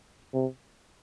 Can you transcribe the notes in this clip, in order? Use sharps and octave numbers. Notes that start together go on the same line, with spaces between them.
C3